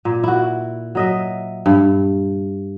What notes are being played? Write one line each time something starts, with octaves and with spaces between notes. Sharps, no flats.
A#2
E4 F#4
F#3 D#5 E5
G2